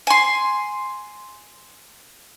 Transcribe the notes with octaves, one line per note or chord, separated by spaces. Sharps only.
G#5 C6